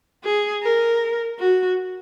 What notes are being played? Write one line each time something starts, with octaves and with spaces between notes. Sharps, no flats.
G#4
A#4
F#4